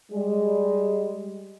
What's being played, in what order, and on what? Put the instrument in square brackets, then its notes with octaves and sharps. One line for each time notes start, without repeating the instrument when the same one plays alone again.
[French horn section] G3 G#3